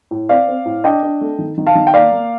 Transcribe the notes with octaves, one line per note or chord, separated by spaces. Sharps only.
A2
C4 D5 F5
C4
A2
D4 D#5 G5
D4
A3
D#3
D#3
F5 A5
D#3
G5
A#3 D5 F5
A#3